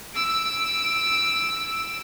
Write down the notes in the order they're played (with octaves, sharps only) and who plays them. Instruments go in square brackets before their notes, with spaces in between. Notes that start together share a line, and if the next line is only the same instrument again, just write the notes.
[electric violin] E6 D7